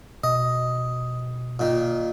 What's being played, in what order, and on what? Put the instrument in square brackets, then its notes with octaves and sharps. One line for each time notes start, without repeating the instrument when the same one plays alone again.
[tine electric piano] B2 [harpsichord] D#5
[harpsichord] A#2 D#3